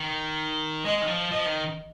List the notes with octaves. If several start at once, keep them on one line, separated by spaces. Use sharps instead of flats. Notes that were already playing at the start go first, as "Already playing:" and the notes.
Already playing: D#3
G#3 D#5
D#3
F3
F3 D#5
D#3